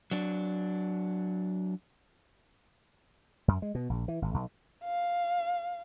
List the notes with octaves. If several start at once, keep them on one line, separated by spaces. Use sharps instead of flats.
F#3 D4
F#2
G#3
B2
A#1
E3
G#1
B1
F5